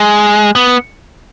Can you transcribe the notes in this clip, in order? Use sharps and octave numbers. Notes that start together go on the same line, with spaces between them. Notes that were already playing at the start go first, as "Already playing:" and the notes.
Already playing: G#3
B3